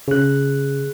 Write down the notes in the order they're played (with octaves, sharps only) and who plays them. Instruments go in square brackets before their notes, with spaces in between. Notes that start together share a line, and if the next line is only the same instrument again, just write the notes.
[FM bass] C#3 [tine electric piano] G#4 F#6